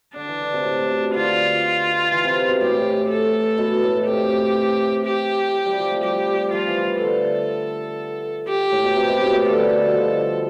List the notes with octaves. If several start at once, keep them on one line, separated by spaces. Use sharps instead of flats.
D3 D4
E3
D3
C3
A2
B2
D3 F4
E3
C3
B2
A2 G4
A4
B2
A2
C3 G4
G4
G3
F3
A3
G3 G4
F3 F4
E3
E3
D3 A4
G4
A2
B2
C3
B2
A2
B2
D3 A4
G3
B2
D3
F3